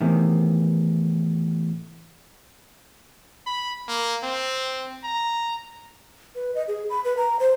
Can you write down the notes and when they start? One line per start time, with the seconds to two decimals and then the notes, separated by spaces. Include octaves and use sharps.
0.01 E2 A2 C3 D#3
3.46 B5
3.88 A#3
4.23 C4
5.04 A#5
6.35 B4
6.55 D#5
6.68 G#4
6.90 B5
7.05 B4
7.17 A#5
7.40 C5